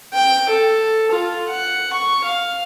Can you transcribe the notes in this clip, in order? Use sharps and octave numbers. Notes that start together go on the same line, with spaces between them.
G5
A4
F4
F#5
C#6
F5